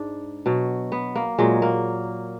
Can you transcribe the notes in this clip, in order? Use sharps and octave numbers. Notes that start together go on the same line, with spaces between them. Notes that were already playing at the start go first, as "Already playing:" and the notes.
Already playing: G#2 D4
B2 F#3
B3
A#3
A#2 F#3 G#3
A#3